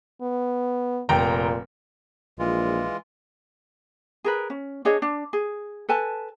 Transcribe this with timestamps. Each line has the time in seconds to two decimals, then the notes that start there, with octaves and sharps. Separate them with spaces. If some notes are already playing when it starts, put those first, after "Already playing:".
0.21 B3
1.09 F1 A#2 G5 A#5
2.39 A#1 E3 G#3 F4
4.24 G#4 A#4 B4
4.50 C#4
4.85 D4 G#4 C#5 D#5
5.02 D4
5.33 G#4
5.89 A4 B4 G#5 A5